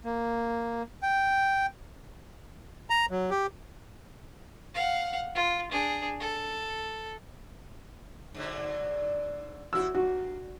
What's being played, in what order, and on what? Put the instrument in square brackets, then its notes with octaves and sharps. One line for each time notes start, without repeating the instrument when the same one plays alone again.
[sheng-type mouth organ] A#3
G5
[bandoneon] A#5
F#3
G4
[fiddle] F5 F#5
F4
D4 G#4
A4
[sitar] G#2 D3 F#3
[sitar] A2 E4 [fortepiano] F#4 E6
[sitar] G2 [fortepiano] F#4